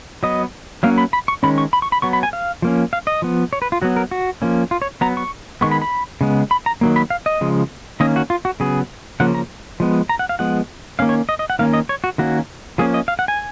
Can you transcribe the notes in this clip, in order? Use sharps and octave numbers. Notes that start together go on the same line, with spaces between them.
F#3 B3 D#5
F#3 A#3 C#4 F5
B5
B5
C#6
D#3 G#3 C#4 B5
C#6
B5
C#6
B5
F#3 B3 C#6
B5
G#5
F5
F3 A#3 C#4
F5
D#5
F3 B3
C#5
B4
F4
F#3 B3 F#4
A#4
F#4
F3 A#3 C#4
F4
C#5
F#3 B3 A#5
C#6
D#3 G#3 B3 C#6
B5
B5
C#3 G#3 B3
B5
A#5
D#3 F#3 A#3
B5
F5
D#5
C#3 F3 G#3
D#3 A#3 C#4 D#5
F#4
F4
F#4
C#3 F#3 B3 G#4
C#3 F3 A#3 C#4 F#5
A#5
F3 G#3 B3
A#5
F#5
F5
F3 G#3 B3 F#5
D#3 A#3 C#4 F5
C#5
D#5
D#5
F#5
D#3 A#3 C#4 F5
D#5
C#5
F#4
D#3 A#3 C#4 F#4
F3 A#3 C#4 G#4
D#5
F5
F#5
G#5